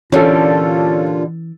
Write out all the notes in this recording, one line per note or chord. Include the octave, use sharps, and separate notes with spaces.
A#2 D3 E3 G3 C#4 D4 F4 A4